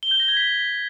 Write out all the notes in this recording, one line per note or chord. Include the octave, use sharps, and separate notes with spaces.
G7
G6
A#6
G#6
B6